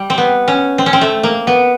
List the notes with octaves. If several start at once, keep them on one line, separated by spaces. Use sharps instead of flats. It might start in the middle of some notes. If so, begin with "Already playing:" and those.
Already playing: G3
C4
B3
C#4
C4
C#4
C4
A3
A#3
B3